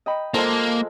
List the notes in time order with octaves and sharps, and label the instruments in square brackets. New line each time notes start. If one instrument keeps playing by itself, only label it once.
[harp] D#5 G5 B5
[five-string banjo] F3 G#3 [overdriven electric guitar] A#3 [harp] A4